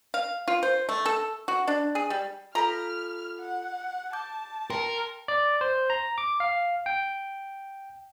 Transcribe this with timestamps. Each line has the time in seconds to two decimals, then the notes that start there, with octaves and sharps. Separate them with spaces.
0.14 F5
0.48 F4
0.63 C5
0.89 A3
1.06 A4
1.48 F#4
1.67 D4
1.95 G#4
2.10 G3
2.55 F4 A4 A#5 B5 F6
3.40 F#5
4.13 A5 D6 G6
4.70 A#4 G5 C6
5.28 D5
5.61 C5
5.90 A#5
6.18 D6
6.40 F5
6.86 G5